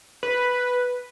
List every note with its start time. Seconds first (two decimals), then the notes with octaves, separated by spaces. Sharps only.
0.23 B4